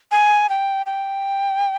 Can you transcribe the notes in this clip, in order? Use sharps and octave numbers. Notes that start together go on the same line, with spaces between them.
G#5
G5
G5